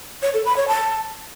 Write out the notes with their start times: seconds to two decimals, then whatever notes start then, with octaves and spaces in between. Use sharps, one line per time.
0.23 C#5
0.34 A4
0.45 B5
0.57 C#5
0.68 A5